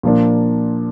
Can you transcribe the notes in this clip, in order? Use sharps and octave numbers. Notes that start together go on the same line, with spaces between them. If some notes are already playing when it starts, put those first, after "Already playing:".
A#2 F3 A#3 D4